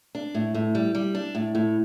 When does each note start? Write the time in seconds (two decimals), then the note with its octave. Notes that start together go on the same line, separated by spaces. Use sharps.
0.15 D4
0.35 A2
0.55 A2
0.75 G3
0.95 G3
1.15 D4
1.35 A2
1.55 A2